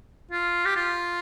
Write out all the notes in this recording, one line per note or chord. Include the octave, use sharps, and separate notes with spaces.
F4
G4
F4